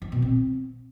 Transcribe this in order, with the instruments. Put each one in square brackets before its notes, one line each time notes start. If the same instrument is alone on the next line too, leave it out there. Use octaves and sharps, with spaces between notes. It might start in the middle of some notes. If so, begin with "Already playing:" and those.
[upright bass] F3
B2
C4